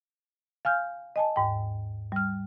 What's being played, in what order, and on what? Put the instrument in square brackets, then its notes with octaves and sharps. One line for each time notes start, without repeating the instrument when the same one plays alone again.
[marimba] F5 G#5 F6 G6
D#5 G#5 A5
D#2 G#2 G5
G3 F6